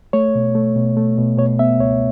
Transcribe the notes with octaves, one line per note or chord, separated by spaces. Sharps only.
A3 C#5
B2
A3
B2
A3
B2
B2 C#5
B3 E5
C#2 C#5